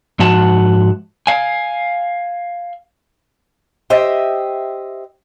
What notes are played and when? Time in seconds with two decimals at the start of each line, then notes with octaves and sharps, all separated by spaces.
0.19 G#2 F3 F#4 F#5 A5
1.27 F5 G#5
3.90 G4 C5 D#5 E5